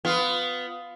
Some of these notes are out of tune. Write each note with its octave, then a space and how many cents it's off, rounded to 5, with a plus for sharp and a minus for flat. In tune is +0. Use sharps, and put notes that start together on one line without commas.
B3 +20 F4 +0